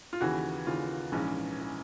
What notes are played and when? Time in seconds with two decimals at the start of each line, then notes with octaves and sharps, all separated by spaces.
0.13 F4
0.21 D#2 C#3 E3 F#4
0.67 D#2 C#3 E3 F4
1.12 A#1 G#2 E3 C#4
1.61 E3